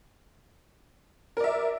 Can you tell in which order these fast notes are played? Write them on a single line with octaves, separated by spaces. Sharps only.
A#4 D5 E5